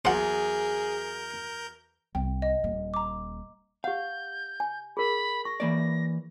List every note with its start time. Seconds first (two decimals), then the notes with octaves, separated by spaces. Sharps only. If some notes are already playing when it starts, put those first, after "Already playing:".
0.05 E2 F#3 G#4 A#4 C5 F#5 G6
2.15 C2 G5
2.42 D#5
2.64 D#1 A#3
2.94 A#5 D6
3.84 G4 F5 F#5 G6
4.60 G#5
4.97 G#4 A#4 B5
5.45 C#6 A#6
5.60 E3 A#3 D5